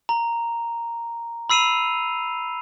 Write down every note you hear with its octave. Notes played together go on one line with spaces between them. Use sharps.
A#5
B5 E6 C7 D#7 F7